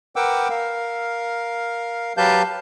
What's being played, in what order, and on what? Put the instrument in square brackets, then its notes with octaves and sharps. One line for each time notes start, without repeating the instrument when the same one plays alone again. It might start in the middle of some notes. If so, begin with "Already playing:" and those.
[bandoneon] A#4 B4 F#5 G5 D6 E6
A#4 F5
F#3 G4 B4 F5 A5 G6